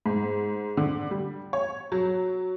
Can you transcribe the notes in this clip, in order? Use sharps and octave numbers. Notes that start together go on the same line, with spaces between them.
G#2
D3
G3
C#5
F#3